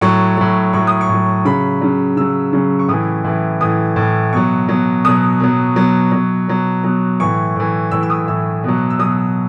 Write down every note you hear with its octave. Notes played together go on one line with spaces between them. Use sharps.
A2 F#3 C#6
A2 F#3
A2 F#3 C#6
D#6
C#6
A2 F#3
C#3 F#3 B5
C#3 F#3
C#3 F#3 E6
C#3 F#3
C#6
A2 E3 D#6
A2 E3
A2 E3 D#6
A2 E3
B2 F#3 C#6
B2 F#3
B2 F#3 D#6
B2 F#3
B2 F#3
B2 F#3
B2 F#3
B2 F#3
A2 E3 C#6
A2 E3
A2 E3 E6
E6
D#6
A2 E3 E6
B2 F#3
E6
B2 F#3 D#6